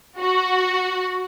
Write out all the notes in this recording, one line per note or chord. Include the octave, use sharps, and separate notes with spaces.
F#4